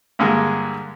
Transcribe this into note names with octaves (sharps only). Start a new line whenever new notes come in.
G2 D3 G#3 A#3